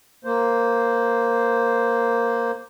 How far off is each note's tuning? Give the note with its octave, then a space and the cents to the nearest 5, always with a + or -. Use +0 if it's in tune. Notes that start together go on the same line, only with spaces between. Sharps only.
A#3 +0 C5 +0